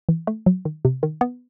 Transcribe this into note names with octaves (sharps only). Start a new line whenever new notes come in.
E3
A3
F#3
D#3
C3
D#3
B3